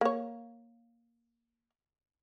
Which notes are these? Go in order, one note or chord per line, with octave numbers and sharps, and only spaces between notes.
A#3 C#5